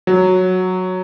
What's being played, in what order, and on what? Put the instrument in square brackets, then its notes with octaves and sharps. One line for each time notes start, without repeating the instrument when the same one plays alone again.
[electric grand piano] F#3